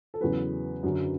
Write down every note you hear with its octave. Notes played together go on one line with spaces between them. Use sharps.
A4
E2 C#3 F#3 B4
F#2 D3 F#3